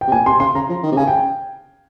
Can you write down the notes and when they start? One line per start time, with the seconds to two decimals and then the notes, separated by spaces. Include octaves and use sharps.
0.01 G5
0.08 C3
0.12 A#2 G#5
0.26 C3 C6
0.40 C#3 C6
0.55 C#3 A#5
0.69 F3
0.83 D#3
0.92 C3
0.97 C#3 G#5
1.07 G5